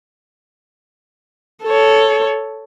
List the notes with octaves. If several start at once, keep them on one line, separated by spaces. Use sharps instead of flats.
A4 C#5